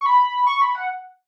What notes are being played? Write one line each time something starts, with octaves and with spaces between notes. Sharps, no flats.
C#6
B5
C#6
B5
F#5